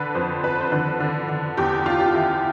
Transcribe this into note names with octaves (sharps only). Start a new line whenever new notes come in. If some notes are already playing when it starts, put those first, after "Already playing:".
Already playing: D3 B4
F2 C5
F2 B4
C5
D3 B4
D3
D3
E2 G4
E2 F4
G4
F4
E3 E4